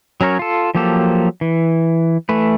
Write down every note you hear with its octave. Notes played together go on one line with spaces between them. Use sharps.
F#3 C#4 A#4 C#5
F4 A4
F3 F#3 A#3 G4 A4
E3
E3 A3 B4